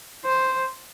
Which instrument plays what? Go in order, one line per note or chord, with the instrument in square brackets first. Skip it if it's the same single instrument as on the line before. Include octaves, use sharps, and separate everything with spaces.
[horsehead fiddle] C5